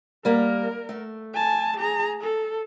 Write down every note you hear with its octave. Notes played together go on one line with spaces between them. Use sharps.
G3 A#3 A#4
A3
G#5 A5
G#4 A#5
A4